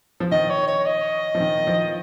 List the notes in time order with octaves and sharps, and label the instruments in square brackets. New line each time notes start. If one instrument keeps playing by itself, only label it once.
[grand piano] F3
[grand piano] D#3 [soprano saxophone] D#5
[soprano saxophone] C#5
C#5
D#5
[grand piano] F3
D#3
F3